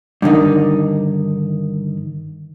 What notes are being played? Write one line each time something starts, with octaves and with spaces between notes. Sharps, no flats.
G2 D3 D#3 D#4